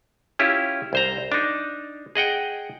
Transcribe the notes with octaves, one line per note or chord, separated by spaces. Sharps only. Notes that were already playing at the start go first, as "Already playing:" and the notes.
C#4 E4 F4 G4
C2 C5 A#5
D4 D#4
G#4 D#5 F#5 G5